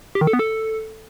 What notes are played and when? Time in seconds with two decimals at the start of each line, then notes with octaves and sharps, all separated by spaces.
0.15 G4
0.21 D#3
0.27 A4
0.33 B3
0.39 A4